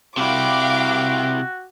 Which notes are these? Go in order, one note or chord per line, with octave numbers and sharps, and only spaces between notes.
C3 E4 F#4 F5 G5 D6